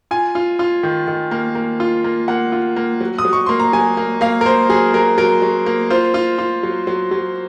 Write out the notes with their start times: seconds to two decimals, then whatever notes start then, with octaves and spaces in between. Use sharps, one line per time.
0.11 F4 G#5
0.35 F4
0.59 F4
0.83 D#3
1.08 D#3
1.31 A#3
1.55 A#3
1.80 F4
2.04 A#3
2.28 A#3 F#5
2.52 F4
2.76 A#3
3.01 F#3
3.18 D#6
3.25 F#3
3.33 C#6
3.46 A#3 C6
3.60 A#5
3.73 F#3 G#5
3.97 A#3
4.21 A#3 F5
4.41 A#4
4.46 A#3 C5
4.69 F#3 G#4
4.94 F#3 A#4
5.18 F#3 A#4
5.42 F#3
5.66 A#3
5.90 F4 C5
6.14 F4
6.38 F4
6.63 F#3
6.87 F#3
7.11 F#3